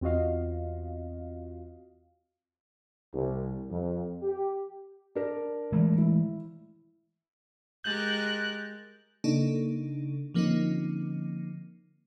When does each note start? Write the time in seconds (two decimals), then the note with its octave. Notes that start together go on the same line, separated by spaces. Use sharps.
0.01 E2 C4 F4 F#4 D#5 F5
3.13 C2
3.70 F2
4.22 G4
5.15 D4 A#4 D5
5.72 E3 G#3 A3
5.98 E4
7.84 G#3 G4 A#4 F#6 G6 A6
9.24 C#3 A#3 D4 D#4 A4
10.34 D3 F3 A#3 C4 C#4 D#4